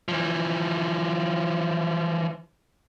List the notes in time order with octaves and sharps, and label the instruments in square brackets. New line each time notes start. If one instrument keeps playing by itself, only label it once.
[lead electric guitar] E3 F3